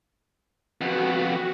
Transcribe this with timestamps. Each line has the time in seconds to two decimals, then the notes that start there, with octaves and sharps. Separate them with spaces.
0.81 F2 B3 F#4